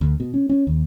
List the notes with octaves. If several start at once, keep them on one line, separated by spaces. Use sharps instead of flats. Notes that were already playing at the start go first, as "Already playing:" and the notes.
D2
B2
C#4
C#4
D#2